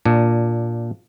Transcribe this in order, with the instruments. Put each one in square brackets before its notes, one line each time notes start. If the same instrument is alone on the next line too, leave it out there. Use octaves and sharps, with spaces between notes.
[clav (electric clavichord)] A#2 D4